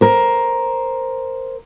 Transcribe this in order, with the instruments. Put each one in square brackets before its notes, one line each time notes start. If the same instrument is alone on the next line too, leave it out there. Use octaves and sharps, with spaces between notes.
[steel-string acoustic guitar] A#4 C5